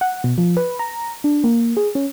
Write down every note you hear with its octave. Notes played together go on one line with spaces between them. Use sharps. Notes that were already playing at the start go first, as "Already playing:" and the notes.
F#5
B2
F3
B4
A#5
D4
A#3
G#4
C#4